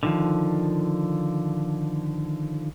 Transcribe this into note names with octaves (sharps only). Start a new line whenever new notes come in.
D3 D#3 F3